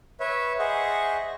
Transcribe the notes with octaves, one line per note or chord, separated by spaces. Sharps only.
B4 C#5 E5
G#4 C5 D#5 E5 F#5 C#6